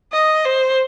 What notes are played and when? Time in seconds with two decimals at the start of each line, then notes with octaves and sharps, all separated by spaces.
0.13 D#5
0.45 C5